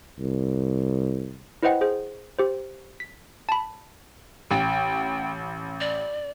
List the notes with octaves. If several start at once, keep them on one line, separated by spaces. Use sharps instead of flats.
C2
E4 B4 C5 D#5 F#5 G5
G#4 C5
G4 C5
B6
A5 B5
A1 G5
D5